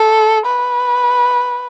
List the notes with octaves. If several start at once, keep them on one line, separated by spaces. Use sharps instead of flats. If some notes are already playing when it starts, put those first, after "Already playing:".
Already playing: A4
B4